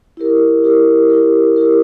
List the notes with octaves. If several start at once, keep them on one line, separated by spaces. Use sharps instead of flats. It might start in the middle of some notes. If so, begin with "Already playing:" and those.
E4 G4 A#4
E4 G4 A#4
E4 G4 A#4
E4 G4 A#4